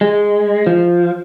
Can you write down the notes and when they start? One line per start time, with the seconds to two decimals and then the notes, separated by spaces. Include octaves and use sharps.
0.01 G#3
0.67 F3